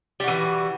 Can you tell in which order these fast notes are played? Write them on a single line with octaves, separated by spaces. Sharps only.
G3 F#4 E3